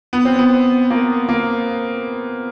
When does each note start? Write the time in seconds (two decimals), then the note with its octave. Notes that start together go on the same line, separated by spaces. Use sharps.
0.13 B3
0.25 C4
0.39 B3
0.90 A#3
1.29 A#3